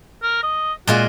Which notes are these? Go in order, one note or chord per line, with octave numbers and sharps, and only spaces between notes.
A#4
D#5
A#2 G#3 F4 F#4